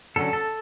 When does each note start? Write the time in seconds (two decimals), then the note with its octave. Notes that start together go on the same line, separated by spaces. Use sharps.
0.16 D3 F#3 C#4 A4
0.33 A4